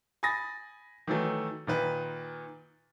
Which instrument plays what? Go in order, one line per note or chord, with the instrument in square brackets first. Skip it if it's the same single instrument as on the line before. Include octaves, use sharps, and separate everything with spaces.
[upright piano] G#5 B5 D#6 A6 A#6
D#3 E3 F#3 A3
A#2 D#3 B4